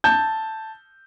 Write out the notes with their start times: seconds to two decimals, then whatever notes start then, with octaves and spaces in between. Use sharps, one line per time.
0.04 A5 G6